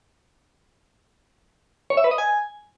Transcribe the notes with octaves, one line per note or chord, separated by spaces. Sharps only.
C#5
E5
B4
D#5
G#5